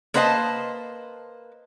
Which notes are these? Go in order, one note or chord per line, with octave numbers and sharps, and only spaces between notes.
A#3 B4 C5 D#5 E5 A5